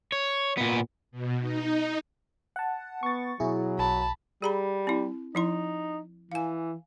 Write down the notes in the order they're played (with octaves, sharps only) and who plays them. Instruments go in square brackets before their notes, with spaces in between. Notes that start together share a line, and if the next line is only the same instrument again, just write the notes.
[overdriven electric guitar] C#5
A#2 B3
[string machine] B2
D#4
[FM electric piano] F#5 A5
[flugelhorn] B3 [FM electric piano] C#6 A6
[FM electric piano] B2 E4 G#4 [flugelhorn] F#3
[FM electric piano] B1 [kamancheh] A5 B5
[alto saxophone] G3 [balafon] G#4 A#5 B5
[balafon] C4 E4
[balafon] F3 E4 C6 [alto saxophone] D#4
[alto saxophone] E3 [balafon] F5 G#5